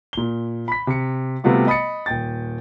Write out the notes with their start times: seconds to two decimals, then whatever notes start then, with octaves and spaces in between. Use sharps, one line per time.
0.13 A#2 G7
0.68 B5 B6
0.87 C3 C#7
1.44 C3 G3 A3 B3 F4 F#4
1.67 D#5 B5 D#6 A6 C#7
2.06 D#1 G5 A6